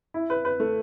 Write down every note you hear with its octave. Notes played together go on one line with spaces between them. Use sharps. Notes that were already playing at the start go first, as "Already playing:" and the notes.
E4
B4
B4
A3